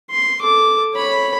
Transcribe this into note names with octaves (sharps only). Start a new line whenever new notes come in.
C6
A4 D6
C#5 B5